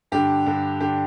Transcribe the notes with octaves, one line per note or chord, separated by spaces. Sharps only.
G2 D3 G4
G2 D3
D3 G4